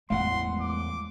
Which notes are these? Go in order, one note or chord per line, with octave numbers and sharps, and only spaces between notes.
E2 A2 G3 G#3 F5 F#5 C6
D6